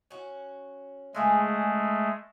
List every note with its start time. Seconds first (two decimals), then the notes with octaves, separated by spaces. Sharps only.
0.10 C#4 F#4
1.14 C#3 G#3 A3 F4 G#4